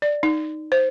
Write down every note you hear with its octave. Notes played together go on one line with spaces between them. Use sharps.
D5
D#4
C5